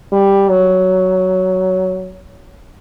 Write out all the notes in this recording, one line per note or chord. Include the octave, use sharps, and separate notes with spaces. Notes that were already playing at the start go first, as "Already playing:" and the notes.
G3
F#3